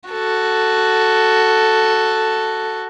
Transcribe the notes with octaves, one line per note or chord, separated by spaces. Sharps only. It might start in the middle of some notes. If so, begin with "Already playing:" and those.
F#4 A4